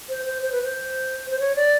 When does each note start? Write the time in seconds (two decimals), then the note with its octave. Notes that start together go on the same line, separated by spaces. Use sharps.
0.09 C5
0.26 C5
0.42 C5
0.52 B4
0.64 C5
1.31 C5
1.40 C#5
1.56 D5